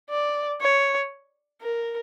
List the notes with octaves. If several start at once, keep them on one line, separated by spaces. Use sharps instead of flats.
D5
C#5
A#4